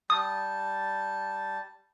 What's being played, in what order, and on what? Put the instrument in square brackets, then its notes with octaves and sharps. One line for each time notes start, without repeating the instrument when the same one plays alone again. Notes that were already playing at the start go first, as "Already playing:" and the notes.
[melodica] G3 A5 [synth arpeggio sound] D#6